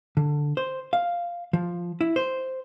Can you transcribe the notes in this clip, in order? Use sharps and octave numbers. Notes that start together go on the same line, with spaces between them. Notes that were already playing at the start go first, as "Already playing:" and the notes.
D3
C5
F5
F3
E4
C5